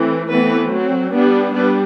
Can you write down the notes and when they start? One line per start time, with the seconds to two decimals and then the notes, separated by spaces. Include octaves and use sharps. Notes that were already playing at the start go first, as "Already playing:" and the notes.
Already playing: E3 A3 C4
0.30 E3 A3 B3 C4 B4
0.71 F#3 C4
1.12 G3 B3 D4
1.53 G3 B3 D4 B4